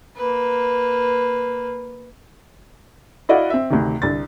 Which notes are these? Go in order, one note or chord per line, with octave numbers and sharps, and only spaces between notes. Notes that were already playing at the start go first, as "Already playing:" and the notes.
A#3 B4
E4 F#4 D5 D#5 F5 F#5
C4 E5
D2 C3 D#3
C2 D3 A6